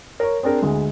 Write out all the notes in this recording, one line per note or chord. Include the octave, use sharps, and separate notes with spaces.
A#4 C#5
C4 D4 G#4 A#4
D2 G#3